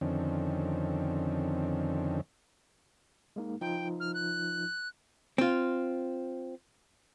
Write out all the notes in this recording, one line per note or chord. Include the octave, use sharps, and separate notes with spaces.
F2 D3 D#3 C4 C#4
G#3 A#3 D#4
F3 D#4 F4 G5
F6
F#6
C4 F4